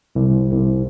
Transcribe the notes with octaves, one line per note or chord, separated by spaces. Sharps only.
C2
C2